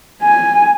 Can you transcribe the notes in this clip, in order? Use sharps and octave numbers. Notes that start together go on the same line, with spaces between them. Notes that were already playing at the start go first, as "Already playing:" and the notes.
G#5